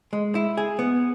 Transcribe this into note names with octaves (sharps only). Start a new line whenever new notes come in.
G#3
E4
G#4
B3